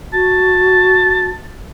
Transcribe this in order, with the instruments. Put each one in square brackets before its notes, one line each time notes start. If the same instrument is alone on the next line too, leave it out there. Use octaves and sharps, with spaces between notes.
[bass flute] F#4 [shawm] A5